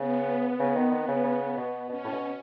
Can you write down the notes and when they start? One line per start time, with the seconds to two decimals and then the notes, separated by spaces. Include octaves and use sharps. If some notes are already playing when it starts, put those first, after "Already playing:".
Already playing: C#3 B3
0.59 C#3
0.76 D#3
0.91 D#3
1.08 C#3
1.24 C#3
1.57 B2
1.89 B2 C#4
2.04 A2
2.12 B2